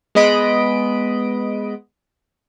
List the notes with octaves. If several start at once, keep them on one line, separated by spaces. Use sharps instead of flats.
G#3 B3 D#5 B5 D7